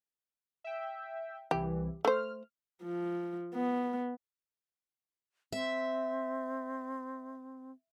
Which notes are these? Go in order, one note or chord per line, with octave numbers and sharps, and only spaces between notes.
E5 G5
C2 E3 G4
A3 C5 F6
F3
B3
C4 E5